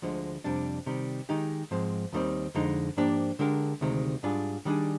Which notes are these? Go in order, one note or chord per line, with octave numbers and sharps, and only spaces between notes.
D2 D3 F3 G#3
F2 C3 G3 D4
C3 D#3 G3
D#3 G#3 D#4 G4
G#2 F3 G#3 C4
D#2 D#3 G3 C4
F2 D3 G#3 D#4
G#2 F3 A#3 D4 G4
D3 G#3 D4 G4 A#4
D2 C3 D#3 G#3
G#2 G3 D4 F4 G#4
D#3 G3 D4 G#4